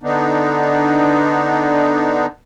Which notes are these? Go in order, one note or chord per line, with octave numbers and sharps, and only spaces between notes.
D3 B3 D4 D#4